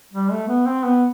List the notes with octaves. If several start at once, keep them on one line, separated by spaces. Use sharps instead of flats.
G3
A3
B3
C4
B3